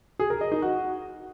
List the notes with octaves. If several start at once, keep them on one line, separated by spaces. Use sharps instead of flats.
G#4
A#4
D#5
D#4
F#4